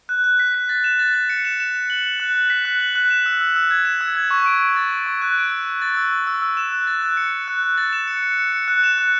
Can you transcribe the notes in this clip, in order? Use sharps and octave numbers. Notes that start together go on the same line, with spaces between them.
F#6
F#6
B6
B6
A6
E7
A6
A6
C#7
E7
E7
E7
F#7
F#7
F#6
F#6
B6
F#6
F#7
F#6
E7
E6
E6
E6
G#6
E7
E6
G#6
C#6
D7
D7
A6
A6
C#6
F#6
D7
E6
E6
A6
E6
E6
E6
E6
E7
F#6
A6
F#6
C#7
C#7
F#6
F#6
A6
E7
C#7
C#7
C#7
C#7
F#6
E7
F#6